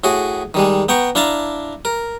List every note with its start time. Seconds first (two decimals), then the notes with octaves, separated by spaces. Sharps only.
0.04 A2 F#4 G#4
0.54 D#3 G3 G#3
0.89 B3 G5 A#5 C#6
1.15 D4 E4 F5 A5 A#5
1.85 A#4